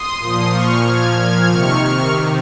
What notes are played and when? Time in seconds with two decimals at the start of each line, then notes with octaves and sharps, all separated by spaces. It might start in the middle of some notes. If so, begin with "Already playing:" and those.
Already playing: C6 D#6
0.20 A#2 F3
0.52 C#6 F6
0.84 F6 G#6
1.17 F6 G#6
1.49 C3 D#3 C#6 F6
1.82 C#6 F6